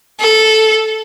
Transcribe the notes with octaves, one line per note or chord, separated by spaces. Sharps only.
A4